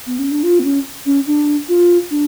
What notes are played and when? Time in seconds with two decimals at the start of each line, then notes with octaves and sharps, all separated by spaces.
0.07 B3
0.19 C#4
0.31 D4
0.43 F4
0.60 B3
0.64 C#4
1.06 C#4
1.27 D4
1.69 F4
2.11 D4